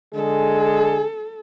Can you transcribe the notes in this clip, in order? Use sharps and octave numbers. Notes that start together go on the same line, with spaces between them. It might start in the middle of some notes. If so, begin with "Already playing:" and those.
D3 G#3 G#4 A4